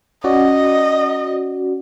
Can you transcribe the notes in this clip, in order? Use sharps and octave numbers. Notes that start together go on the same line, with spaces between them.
C#4 F#4 D5 D#5